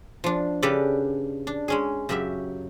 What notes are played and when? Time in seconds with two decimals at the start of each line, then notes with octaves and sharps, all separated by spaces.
0.24 F3 D4
0.63 C#3 D4 G4 A4 B4 D5
1.47 D4
1.68 G#3 C#4 G#4
2.09 F#2 C#3 F#3 G4 E5